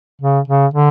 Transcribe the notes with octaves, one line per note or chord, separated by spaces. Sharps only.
C#3
C#3
D3